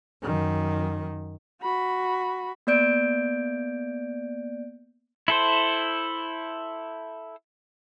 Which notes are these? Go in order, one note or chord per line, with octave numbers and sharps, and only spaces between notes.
F#2 D#3
F#4 B5
A#3 B3 D5 G6 D7
E4 A4 C5